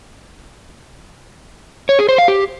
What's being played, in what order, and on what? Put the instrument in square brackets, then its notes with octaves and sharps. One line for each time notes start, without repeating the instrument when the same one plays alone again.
[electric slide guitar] C#5
G#4
C5
F5
G4